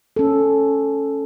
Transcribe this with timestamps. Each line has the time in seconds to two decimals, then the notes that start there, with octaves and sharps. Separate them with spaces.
0.16 C#4 A4